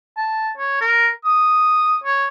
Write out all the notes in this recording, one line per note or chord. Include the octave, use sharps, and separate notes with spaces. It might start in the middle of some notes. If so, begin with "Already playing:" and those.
A5
C#5
A#4
D#6
C#5